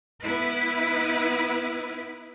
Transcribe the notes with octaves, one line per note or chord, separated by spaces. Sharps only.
B3 E4 B4